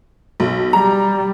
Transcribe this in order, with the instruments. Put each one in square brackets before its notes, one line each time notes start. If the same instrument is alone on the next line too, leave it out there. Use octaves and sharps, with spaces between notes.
[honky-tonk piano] B1
[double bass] G3 [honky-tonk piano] A#5